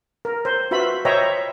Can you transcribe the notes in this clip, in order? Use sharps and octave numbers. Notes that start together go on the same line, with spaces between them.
A#4
C5
F4 F#4 B4 E5 B5
C5 C#5 D#5 E5 G5 A#5